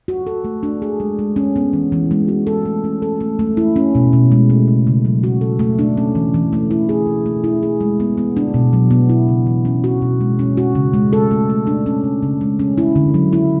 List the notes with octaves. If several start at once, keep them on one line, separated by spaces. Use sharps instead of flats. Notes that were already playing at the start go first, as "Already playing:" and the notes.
F#4
A4
A3
D4
G#4
G#3
G#3
C#4
B3
E3
E3
G#3
F#4
A4
A3
C#4
A4
A3
A3
E4
C#4
B2
B2
G#3
A3
C#3
C#3
F#3
F#4
A4
A3
D4
C#4
E3
E3
A3
E4
G#4
B2
A3
E4
G#4
G#3
B3
B3
D4
B2
F#3
B3
E4
C#3
E3
C#4
F#4
B2
G#3
C#4
F#4
C#3
G#3
A4
A3
A3
D4
C#4
C#3
C#3
G#3
C#4
E4
D3
F#3
E4